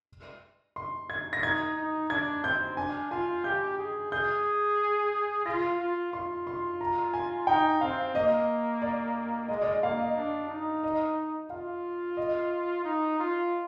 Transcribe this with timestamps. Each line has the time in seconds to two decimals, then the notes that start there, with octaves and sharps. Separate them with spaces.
0.76 C6
1.10 G#6
1.33 A#6
1.42 D#4 G#6
1.76 D#4
2.10 D4 G#6
2.44 C4 G6
2.77 D4 G#5
3.11 F4 G#5
3.44 G4 G6
3.78 G#4
4.11 G#4 G6
5.45 F4 A#6
5.79 F4
6.13 F4 C6
6.47 C6
6.81 A#5
7.13 G#5
7.47 D#4 G5
7.81 C4 F5
8.15 A#3 D#5
8.82 D5
9.48 G#3 D#5
9.62 D5
9.65 D#5
9.82 A#3 F5
9.99 D#5
10.16 D4
10.50 D#4
10.83 D#5
11.50 F4 F5
12.17 D#5
12.85 D#4
13.19 F4